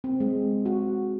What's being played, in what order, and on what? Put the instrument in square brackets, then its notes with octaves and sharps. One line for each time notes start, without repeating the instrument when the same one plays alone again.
[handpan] C4
G#3
F#4